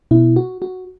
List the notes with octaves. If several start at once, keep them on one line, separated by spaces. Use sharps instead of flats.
B2 E4
F#4
F#4